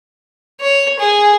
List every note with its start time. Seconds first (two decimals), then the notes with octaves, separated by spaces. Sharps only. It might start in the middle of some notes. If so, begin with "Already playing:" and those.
0.61 C#5
0.99 G#4